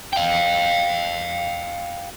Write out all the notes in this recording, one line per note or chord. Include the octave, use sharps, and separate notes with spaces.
F5 G5